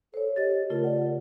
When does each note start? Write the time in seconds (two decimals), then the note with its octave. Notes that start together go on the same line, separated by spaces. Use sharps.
0.14 A4 C5 C#5
0.36 G4 D#5 A6
0.70 C#3 A3 F4 A#4
0.84 D5 F#5